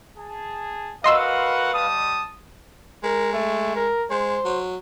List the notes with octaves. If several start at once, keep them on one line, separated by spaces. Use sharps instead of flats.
G#4 A5
F#4 A#4 B4 D#5 F5 F#5 C6 E6
G3 A5 D#6
G#3 A#4
A3
A#4
G#3 C5
F#3